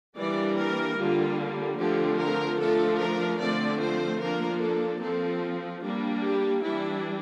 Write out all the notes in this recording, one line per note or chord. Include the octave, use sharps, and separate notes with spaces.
E3 G3 A#3 D4 D5
A#4
D3 G3 A#3 F4
D3 F3 A3 C4 G4
A#4
F3 A3 D4 A4
A#4
D3 F3 A3 C4 D5
C5
F3 A#3 D4 A#4
A4
F3 C4 A4
G3 A#3 D4
G4
E3 G3 D4 E4